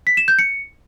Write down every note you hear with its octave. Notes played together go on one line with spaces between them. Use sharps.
B6
E7
G6
C#7